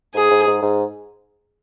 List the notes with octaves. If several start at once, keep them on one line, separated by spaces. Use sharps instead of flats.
G#2 G#4
G#2
G#2
G#2